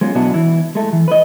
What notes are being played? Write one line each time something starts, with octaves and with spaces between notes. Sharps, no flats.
G#3 B3 C#4 F4 F#4
B2 F#3 B3 D4 E4 F#4
E3 E4
G#3 A3
E3
B4 D#5